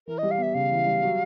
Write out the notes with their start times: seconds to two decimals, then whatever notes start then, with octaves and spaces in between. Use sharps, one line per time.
0.07 E3 A#4
0.18 G3 D#5
0.31 F5
0.38 B3 E5
0.54 C#3 F5
0.71 E3
0.86 G3
1.02 F#3